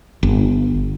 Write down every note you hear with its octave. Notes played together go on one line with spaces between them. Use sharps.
G1